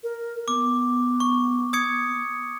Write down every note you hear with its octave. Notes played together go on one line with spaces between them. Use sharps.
A#4
B3 D6
C#6
D#6 G#6 C#7